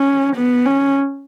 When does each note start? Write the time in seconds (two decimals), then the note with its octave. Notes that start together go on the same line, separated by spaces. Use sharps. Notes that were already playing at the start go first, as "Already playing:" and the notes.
Already playing: C#4
0.36 B3
0.66 C#4